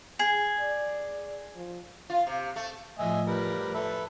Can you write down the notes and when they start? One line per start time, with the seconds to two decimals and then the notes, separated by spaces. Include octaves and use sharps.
0.19 G#4
0.60 D5
1.55 F3
2.10 F4
2.27 C3
2.56 A3
2.99 A2 F3 A3 D#5 E5 G#5
3.27 G3 A#4 B4
3.75 A4 B4 E5